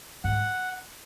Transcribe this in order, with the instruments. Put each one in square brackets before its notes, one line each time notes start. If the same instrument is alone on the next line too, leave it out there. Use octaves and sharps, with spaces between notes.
[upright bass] G#2 [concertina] F#5